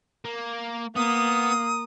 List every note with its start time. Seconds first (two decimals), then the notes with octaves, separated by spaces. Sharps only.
0.25 A#3
0.96 A#3 B3 D#6